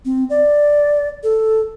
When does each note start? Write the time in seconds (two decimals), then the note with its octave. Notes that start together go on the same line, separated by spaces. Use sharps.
0.05 C4
0.30 D5
1.23 A4